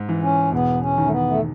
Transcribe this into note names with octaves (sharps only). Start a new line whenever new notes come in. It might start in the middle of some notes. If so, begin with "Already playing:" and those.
Already playing: G#2
E3
C#4
E1 B3
C#4
D#3
A3
B3
A3